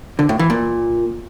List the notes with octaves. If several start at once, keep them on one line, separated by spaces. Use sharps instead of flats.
D3
A2
E3
A#2